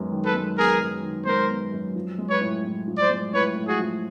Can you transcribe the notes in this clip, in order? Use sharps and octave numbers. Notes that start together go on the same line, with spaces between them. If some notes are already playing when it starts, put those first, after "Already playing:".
Already playing: F#2 D#3 G#3 B3
D#3
A4 B4
G#3
B3 G#4 A#4
F#2
D#3
G#3 A#4 C5
B3
F#2
F3
G#3
B4 C#5
A2
A2
F3
C5 D5
G#3
A2 B4 C#5
A2
F#4 G#4
F3